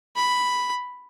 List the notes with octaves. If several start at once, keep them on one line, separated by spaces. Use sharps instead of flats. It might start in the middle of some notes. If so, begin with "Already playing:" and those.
B5